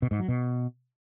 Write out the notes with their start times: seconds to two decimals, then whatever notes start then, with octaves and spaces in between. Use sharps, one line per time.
0.02 B2
0.11 G#2
0.20 F#3
0.28 B2